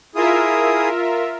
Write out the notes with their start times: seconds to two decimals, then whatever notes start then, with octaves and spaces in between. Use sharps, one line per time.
0.15 E4 F4 G#4 A#4 E5 D#6